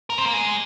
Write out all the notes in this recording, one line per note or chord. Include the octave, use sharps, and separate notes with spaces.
A#4
C4
A#3
G#3